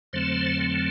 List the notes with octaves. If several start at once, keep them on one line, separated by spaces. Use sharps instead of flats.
F2 D3 F#3 A3 C4 C5